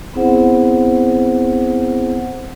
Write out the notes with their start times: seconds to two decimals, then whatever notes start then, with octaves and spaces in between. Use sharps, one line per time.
0.14 B3 C4 E4 G#4 C5 F#5